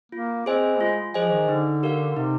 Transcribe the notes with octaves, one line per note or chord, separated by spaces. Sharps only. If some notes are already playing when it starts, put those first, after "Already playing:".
A#3 F4
C4 G#4 C5 D#5 G#5
G#3 F4
F3 G#4 C5 D#5 G#5
D#3
D3 D#4
G4 A#4 F5
C3 D#4